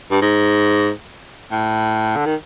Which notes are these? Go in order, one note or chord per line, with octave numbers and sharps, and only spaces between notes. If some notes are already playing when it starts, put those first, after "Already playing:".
G2
G#2
A2
D3
D#3